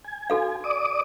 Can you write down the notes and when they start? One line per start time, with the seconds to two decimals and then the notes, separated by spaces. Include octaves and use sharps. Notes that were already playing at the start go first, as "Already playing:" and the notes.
0.04 G#5
0.30 F#4 A4 F5
0.64 D5 D6 D#6